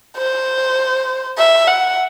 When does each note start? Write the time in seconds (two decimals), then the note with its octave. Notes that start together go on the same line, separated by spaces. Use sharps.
0.18 C5
1.38 E5
1.68 F#5